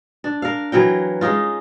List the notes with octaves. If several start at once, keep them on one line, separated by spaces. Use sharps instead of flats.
D4
A#4 F5
E3 F#3 A#4 G5
G#3 C#4 D#4 F4